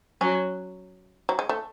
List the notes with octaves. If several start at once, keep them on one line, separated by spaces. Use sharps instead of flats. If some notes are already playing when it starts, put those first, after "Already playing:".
F#3 C#4
F#3
G#3
A3